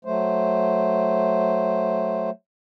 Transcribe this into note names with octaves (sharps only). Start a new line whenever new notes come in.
F#3 A3 C5